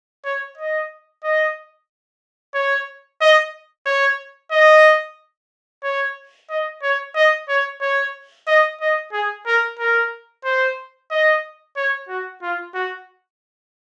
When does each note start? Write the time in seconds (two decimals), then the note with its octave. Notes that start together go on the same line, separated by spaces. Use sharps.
0.25 C#5
0.58 D#5
1.23 D#5
2.54 C#5
3.21 D#5
3.86 C#5
4.52 D#5
5.83 C#5
6.50 D#5
6.82 C#5
7.15 D#5
7.49 C#5
7.81 C#5
8.47 D#5
8.80 D#5
9.12 G#4
9.46 A#4
9.79 A#4
10.44 C5
11.11 D#5
11.76 C#5
12.09 F#4
12.42 F4
12.74 F#4